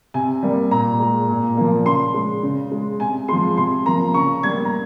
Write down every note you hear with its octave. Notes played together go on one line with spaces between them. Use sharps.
C3 G#5
G3 A#3
A#2 A#5
G#3
A#2
F3 A#3
C#3 C6
G#3
C#3
G#3
C3 G#5
F3 G#3 C6
C3 C6
F3 A#3 A#5
C#3 C#6
G3 A#3 G#6
A#5